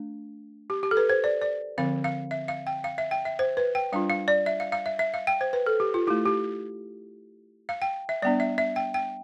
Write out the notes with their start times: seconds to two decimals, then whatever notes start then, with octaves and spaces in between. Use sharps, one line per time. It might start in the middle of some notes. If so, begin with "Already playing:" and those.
Already playing: A3 D4
0.70 G4
0.83 G4
0.91 A4
0.97 B4
1.10 C5
1.24 D5
1.42 D5
1.78 D3 F3 C4 F5
2.04 F5
2.31 E5
2.48 F5
2.67 G5
2.84 F5
2.98 E5
3.11 G5
3.25 E5
3.39 C5
3.57 B4
3.75 G5
3.92 G3 D4 F4 F5
4.10 F5
4.28 D5
4.46 E5
4.60 F5
4.72 F5
4.86 E5
4.99 E5
5.14 F5
5.27 G5
5.41 C5
5.53 B4
5.66 A4
5.80 G4
5.94 F4
6.07 A3 E4 G4
6.25 G4
7.69 F5
7.82 G5
8.09 E5
8.22 G3 B3 D4 D5
8.40 E5
8.58 E5
8.76 G5
8.94 G5